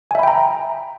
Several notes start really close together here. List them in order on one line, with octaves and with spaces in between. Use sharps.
G#5 E5 B5 G5 A#5